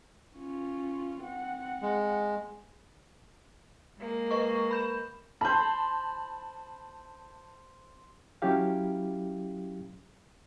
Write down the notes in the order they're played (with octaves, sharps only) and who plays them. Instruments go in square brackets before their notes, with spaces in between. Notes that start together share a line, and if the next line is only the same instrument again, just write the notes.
[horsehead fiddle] C#4 F4
C4 F#5
[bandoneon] G#3
[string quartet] G#3 A#3
[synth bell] B4 D#5 C#6
B5 G6 E7
[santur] C5 B5 [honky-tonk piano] A5
[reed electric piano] F#3 C#4 E4 G4 F5